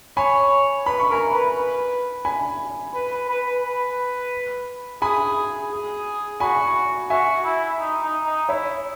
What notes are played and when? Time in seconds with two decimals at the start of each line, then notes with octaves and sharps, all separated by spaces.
0.17 C#5 G#5 B5
0.86 B4 B5
0.99 C#6
1.09 A#4 G#5 B5
1.32 B4
1.56 B4
2.25 G#5 B5
2.94 B4
3.12 B4
3.29 B4
3.46 B4
3.64 B4
5.02 G#4 G#5 B5
5.72 G#4
6.40 F#4 G#5 B5
7.10 F#4 E5 G#5
7.44 E4
7.79 D#4
8.03 D#4
8.26 D#4
8.48 E4 C#5 E5